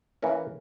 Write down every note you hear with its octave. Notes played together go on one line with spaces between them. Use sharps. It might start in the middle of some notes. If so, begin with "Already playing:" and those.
E3 A#3 C#4 E4 A#4